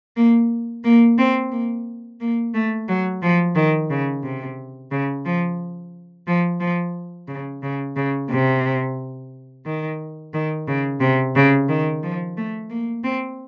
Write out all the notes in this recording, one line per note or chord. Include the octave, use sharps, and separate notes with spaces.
A#3
A#3
C4
A#3
A#3
A3
F#3
F3
D#3
C#3
C3
C#3
F3
F3
F3
C#3
C#3
C#3
C3
D#3
D#3
C#3
C3
C#3
D#3
F3
A3
A#3
C4